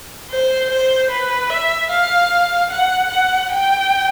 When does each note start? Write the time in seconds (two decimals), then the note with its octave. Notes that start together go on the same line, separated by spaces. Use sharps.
0.30 C5
0.70 C5
1.10 B4
1.50 E5
1.90 F5
2.70 F#5
3.10 F#5
3.51 G5